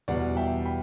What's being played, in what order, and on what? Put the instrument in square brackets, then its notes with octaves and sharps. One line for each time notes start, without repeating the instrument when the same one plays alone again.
[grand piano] E2 B2 G3 D5 F#5
E5 G5
G5 B5